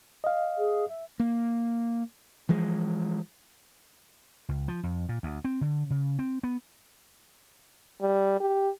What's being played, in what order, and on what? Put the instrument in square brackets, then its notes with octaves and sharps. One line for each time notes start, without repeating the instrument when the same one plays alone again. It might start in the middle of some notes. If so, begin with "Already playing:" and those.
[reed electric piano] D#5 F5
[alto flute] G#4
E5
[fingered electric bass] A#3
E3 F3 G#3
[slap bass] C#2
F3
F2
A#2
D2
C4
D3
C#3
C4
B3
[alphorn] G3
G4